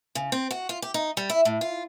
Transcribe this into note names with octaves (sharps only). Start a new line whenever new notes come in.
C#3
C4
F#4
F4
G4
D#4
G3
E4
A2
F4